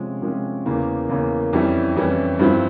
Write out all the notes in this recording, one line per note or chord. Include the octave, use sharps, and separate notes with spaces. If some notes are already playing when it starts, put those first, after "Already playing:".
Already playing: C3 F3 G#3 C#4
C3 F3 G#3 C#4
E2 C#3 E3 A#3
E2 C#3 E3 A#3
F2 E3 G3 C#4 E4
F2 E3 G3 C#4 E4
G2 F3 C4 E4